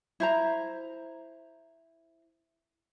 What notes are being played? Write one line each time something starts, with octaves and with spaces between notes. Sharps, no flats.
E4 C5 A#5